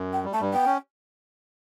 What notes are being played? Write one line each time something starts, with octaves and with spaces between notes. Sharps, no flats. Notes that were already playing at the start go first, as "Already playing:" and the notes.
Already playing: F#2
G5
G3
A3 A5
G2 G3
B3 G5
C#4